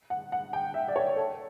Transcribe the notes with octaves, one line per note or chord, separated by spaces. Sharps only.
F#5
F#5
G5
E5
D5
C#5
A4